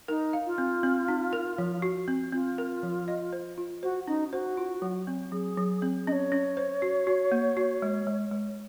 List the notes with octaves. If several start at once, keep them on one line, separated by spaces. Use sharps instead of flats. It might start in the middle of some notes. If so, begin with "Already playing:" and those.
D#4 A#4
F5
F4
C4
C4
D#4
A#4
F3
F#4
C4
C4 F4
A#4
F3
D#5
C5
F4
F#4 C5
C#4 D#4
F#4 C5
F4
F#3
C4
F#3 G#4
F#3
C4
C#4 C#5 D#5
C#4
C5
F#4
F#4
A#3
F#4
G#3
G#3
G#3